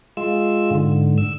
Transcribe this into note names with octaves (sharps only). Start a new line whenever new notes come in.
G#3 F4 E6
G#2 D3
E6